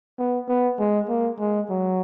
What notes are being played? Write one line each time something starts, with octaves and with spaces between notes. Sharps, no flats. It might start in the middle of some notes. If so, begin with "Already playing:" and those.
B3
B3
G#3
A#3
G#3
F#3